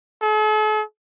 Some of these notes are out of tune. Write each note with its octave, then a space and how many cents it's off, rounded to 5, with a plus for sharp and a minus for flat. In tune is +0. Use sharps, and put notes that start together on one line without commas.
A4 -45